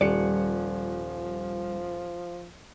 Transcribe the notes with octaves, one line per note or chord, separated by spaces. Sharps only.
D#1 F3 G3 D5 C#7